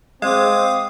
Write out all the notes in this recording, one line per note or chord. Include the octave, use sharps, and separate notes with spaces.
G#3 C4 F5 D6 D#6